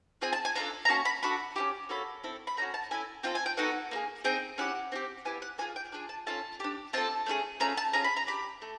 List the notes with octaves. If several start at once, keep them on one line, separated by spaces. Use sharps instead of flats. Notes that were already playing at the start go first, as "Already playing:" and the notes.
C4 F4 G#4 G#5
A5
G#5
D4 F4 A4 A#5
A#5
A#3 C#4 F#4 A5
B5
D4 F#4 A4 B5
C#4 E4 G4
A#3 C#4 F#4 A4 B5
C4 E4 A4
B5
A3 C#4 F#4 A#5
A5
C#4 E4 A4 G#5
C4 F4 A4 G5
G#5
G5
B3 D#4 F#4 A4 F#5
A#3 D#4 G#4
C4 D#4 G#4 G5
C#4 E4 G4 F#5
C4 D#4 G4
B3 E4 G4 G#5
F#5
A#3 D4 F4 G#4 G#5
G5
D4 F4 G#4
A5
C#4 F4 A4 A5
D4 G4
C4 F4 A4 A5
A3 C#4 F4 G#4
A3 C#4 F4 A#5
A5
C#4 F4 G#4 A#5
B5
A#5
D4 G4 B5
A3